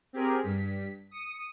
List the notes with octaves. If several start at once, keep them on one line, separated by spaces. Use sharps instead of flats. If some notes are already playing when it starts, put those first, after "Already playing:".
C4 G4 G#4 A#4
G2 B6
D#6 C#7 D#7